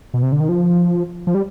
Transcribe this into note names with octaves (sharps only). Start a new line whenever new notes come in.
B2
C3
D3
D#3
F3
F3
G3